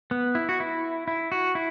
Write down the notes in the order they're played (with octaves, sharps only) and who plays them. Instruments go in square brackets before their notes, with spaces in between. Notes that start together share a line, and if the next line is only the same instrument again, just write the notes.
[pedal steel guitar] B3
E4
F#4
E4
E4
F#4
E4